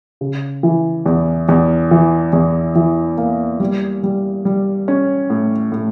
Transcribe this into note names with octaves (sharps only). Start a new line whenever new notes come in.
C#3
E3
E2
E2
E3
E2
E3
A#3
G3
G3
G3
C#4
A2
A2